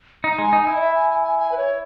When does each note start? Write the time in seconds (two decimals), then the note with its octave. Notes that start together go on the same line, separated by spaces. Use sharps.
0.24 D#4 A#5
0.38 G#3 G#5
0.53 D#4
0.62 E4 G#5
0.76 D#5
0.81 E5
0.95 G#5
1.10 G#5
1.24 G#5
1.39 G#5
1.52 B4
1.57 C#5